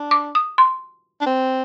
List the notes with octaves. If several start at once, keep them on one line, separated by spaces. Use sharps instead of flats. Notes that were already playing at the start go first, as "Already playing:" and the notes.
Already playing: D4
D6
D#6
C6
D4
C4